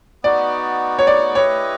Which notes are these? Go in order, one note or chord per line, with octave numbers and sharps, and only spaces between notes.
B3 D#4 F#4 D5
C#5
D5
E4 G4 B4 C#5 D#5